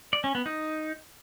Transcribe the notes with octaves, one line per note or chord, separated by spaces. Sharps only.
D5
C#4
B3
D#4